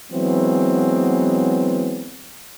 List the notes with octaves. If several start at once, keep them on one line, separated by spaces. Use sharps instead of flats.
E3 F#3 G#3 B3 C4